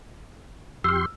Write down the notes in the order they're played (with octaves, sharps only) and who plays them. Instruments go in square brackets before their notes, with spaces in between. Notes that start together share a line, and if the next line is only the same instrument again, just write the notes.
[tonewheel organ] F2 G4 C6 [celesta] E6 F6